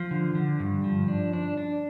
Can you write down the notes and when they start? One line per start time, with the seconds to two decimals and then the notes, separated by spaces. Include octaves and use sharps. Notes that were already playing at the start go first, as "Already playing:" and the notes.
Already playing: F3
0.11 D3
0.35 D3
0.60 G2
0.84 F3
1.08 D4
1.33 D4
1.58 D4